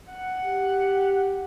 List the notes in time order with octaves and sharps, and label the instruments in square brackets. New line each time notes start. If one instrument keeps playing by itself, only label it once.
[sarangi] F#5
[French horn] G4